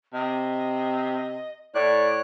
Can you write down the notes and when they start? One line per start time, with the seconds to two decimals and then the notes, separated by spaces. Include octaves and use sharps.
0.13 C3 D#5
1.75 A2 C#5 D5 F#6